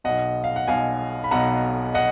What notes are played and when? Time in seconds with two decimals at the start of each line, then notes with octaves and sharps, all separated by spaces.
0.04 B1 B2 D#5 F#5
0.44 F5
0.56 F#5
0.68 B1 B2 F5 G#5
1.24 B5
1.31 B1 B2 F#5 A#5
1.94 D#5 F#5